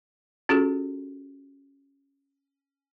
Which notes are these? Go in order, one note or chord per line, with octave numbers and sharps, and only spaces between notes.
C#4 F4 F#4 G#4 A4